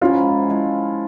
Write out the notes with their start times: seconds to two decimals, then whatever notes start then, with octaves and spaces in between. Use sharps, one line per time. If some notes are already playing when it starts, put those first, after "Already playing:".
0.01 G#2 F3 G#3 C#4 E4 F4
0.49 F3 G#3 E4